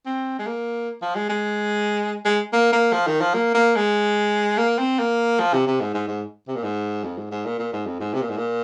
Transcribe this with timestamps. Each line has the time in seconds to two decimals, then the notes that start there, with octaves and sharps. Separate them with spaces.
0.06 C4
0.39 G#3
0.47 A#3
1.02 F3
1.15 G#3
1.29 G#3
2.25 G#3
2.53 A#3
2.73 A#3
2.93 F3
3.07 D#3
3.21 F3
3.34 A#3
3.54 A#3
3.76 G#3
4.58 A#3
4.79 C4
4.99 A#3
5.40 F3
5.54 C3
5.67 C3
5.81 G#2
5.94 G#2
6.08 G#2
6.48 C3
6.56 A#2
6.63 G#2
7.04 F2
7.18 G#2
7.31 G#2
7.45 A#2
7.59 A#2
7.73 G#2
7.86 F2
8.00 G#2
8.14 C3
8.22 A#2
8.30 G#2
8.37 A#2